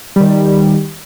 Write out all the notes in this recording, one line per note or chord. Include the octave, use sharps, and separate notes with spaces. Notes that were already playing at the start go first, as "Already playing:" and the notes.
D#3 G3